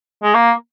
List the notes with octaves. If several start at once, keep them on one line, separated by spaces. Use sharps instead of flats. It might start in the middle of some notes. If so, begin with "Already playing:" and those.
G#3
A#3